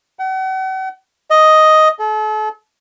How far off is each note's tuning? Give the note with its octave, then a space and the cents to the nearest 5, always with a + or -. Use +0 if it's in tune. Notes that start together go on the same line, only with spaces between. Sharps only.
F#5 +40
D#5 +5
A4 -40